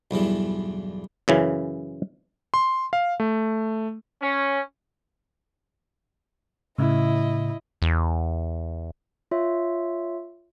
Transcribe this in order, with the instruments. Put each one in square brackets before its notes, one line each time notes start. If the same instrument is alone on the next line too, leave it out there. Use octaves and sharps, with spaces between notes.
[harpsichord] B1 E2 G2 E3
[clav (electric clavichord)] F#2 C#3 E3
[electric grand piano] C6
F5
A3
[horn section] C#4
[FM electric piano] A2 C#3 [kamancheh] E4 D#5
[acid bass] E2
[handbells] F4 C#5 E5